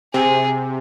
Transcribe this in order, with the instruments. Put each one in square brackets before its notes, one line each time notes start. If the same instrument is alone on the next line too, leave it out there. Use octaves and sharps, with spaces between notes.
[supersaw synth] C3 [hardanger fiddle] G#4